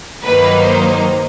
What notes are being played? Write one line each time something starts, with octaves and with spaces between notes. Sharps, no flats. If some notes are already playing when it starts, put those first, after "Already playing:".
G2 D#3 F#3 A#3 D#4 B4
C5